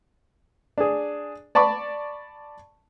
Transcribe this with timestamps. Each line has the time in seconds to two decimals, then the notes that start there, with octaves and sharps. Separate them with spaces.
0.78 D4 G#4
1.55 D5 A5 B5 C#6 D6